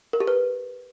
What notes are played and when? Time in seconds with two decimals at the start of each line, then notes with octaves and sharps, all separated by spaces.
0.13 A#4
0.20 G4
0.28 B4